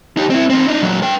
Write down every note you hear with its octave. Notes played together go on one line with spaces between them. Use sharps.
D#4 G4
C4 E4
C4 D#4
D4 D#4
A#2 F#3
B4 G5